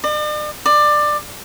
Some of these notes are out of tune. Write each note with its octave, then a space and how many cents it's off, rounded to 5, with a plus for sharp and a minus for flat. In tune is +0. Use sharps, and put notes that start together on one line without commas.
D5 +45
D5 +20